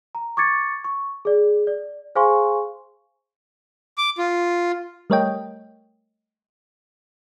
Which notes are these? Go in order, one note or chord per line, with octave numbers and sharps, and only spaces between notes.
A#5
C#6 D6 G#6 A6 C#7
C#6
G#4 D5
D5
G#4 C5 F5 G#5 C6 C#6
D6
F4
G3 A3 A#4 C#5 D#5 G5